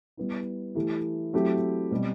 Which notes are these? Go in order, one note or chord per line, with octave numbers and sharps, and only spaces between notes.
G3 B3 E4
E3 A3 E4 G4
F#3 A3 C4 E4 G4
B2 G3 C4